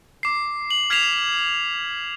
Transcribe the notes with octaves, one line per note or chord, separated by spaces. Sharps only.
D6 C7
F#7
F6 G#6 B6 C7 E7 F7